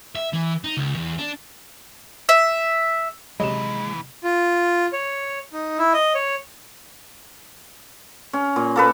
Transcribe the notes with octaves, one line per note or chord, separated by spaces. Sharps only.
E5
E3
D#4
C#2
E2
D4
E5
D#2 C3 E3 F#3 G#3 D#5 E7
F4
C#5
D#4
E4
D#5
C#5
C#4
A#2
A#3 A4 B4